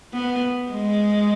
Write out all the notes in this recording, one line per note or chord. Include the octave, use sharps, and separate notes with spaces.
B3
G#3